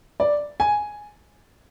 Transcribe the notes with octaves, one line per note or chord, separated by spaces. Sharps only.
D5
G#5